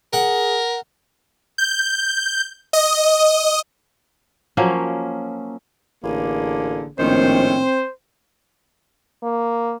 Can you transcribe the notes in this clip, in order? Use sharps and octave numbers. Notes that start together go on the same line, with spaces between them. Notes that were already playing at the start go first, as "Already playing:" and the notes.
G#4 A#4 F#5
G6
D#5
F3 F#3 A#3 C#4
A1 D3 A#3 G#4
A#1 A2 D#3 C4 C#4 C5
A#3